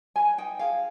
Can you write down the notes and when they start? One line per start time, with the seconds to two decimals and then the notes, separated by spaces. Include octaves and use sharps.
0.16 B4 G#5
0.38 D#4 G5
0.59 G#4 F5